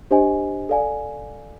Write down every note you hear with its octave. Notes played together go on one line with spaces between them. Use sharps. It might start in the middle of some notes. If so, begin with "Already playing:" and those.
D4 G4 C5 D#5 G#5
A4 D5 F5 G#5